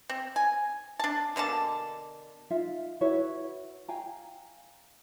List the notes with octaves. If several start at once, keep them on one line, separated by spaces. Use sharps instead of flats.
C4
G#5
D4 A5
B2 D3 A#3 A5
D#4 F4 E5 F5
E4 F#4 B4 C#5
F5 G5 G#5 A#5